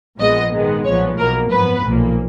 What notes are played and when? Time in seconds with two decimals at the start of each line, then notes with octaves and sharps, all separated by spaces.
0.18 A#1 A#2 F3 G#3 B3 D#5
0.51 G#2 D#3 G#3 B3
0.84 B1 A#2 F3 B3 C#5
1.18 B1 B2 A#3 A#4
1.50 G#1 F#2 F3 B3 B4
1.84 B1 A#2 F3 A#3